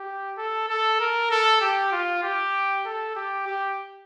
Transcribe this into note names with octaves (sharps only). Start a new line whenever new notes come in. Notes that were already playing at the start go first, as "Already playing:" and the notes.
Already playing: G4
A4
A4
A#4
A4
G4
F4
G4
A4
G4
G4